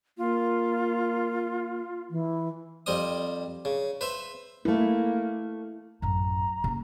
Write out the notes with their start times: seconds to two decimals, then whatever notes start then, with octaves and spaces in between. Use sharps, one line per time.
0.18 A#3 F4
2.10 E3
2.86 F2 G3 C4 D#5 D#6
3.65 C#3
4.01 B4 C5 E5
4.65 A3 A#3 E4 B4
6.02 A1 F#2 A#5
6.64 C#3 A#3